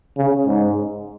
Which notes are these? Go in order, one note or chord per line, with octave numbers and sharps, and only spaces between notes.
C#3
G#2